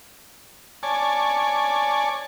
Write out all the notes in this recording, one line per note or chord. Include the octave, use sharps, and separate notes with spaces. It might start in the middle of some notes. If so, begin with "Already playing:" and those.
C#5 D5 G#5 A5